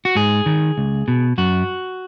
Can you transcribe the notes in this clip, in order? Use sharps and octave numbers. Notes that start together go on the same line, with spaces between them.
F#4
G#2 G#4
D#3
C#2
B2
F#2 F#4